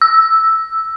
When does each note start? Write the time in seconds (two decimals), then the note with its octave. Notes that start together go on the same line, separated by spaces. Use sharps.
0.01 E6